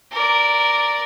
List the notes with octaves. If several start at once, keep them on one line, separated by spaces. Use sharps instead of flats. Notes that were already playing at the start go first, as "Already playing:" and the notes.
A#4 D5